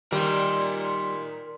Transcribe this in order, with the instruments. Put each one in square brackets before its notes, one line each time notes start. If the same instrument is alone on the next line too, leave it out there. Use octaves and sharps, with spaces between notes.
[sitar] A#2 D#3 [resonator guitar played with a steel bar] G3 [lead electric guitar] A#4 C6